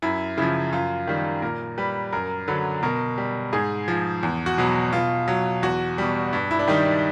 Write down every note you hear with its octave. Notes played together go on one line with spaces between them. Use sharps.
F#2 E4
C#3 F3 E4
F#2 F4
D#3 G3
A#2 A#4
G3 B4
F#2 A#4
D3 F#3 B4
B2 A#4
G3
G#2 G#4
F3
E2
F#4
B2 F#3
B2 F4
F#3
E2 F#4
B2 G3
G2
E4
D4
D#3 G3 D#4
D4